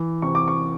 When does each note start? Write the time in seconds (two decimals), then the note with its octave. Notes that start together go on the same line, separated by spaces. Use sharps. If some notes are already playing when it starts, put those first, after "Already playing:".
Already playing: E3
0.22 C3 C#6
0.35 D6
0.48 C#6